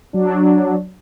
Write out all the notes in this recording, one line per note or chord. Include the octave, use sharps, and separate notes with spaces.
F#3 D4